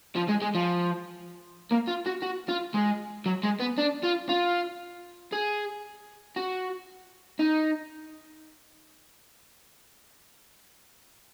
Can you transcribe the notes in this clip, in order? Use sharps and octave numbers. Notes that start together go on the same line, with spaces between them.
F3
G#3
G#3
F3
A#3
F4
F#4
F#4
F4
G#3
F#3
G#3
B3
D4
F4
F4
G#4
F#4
D#4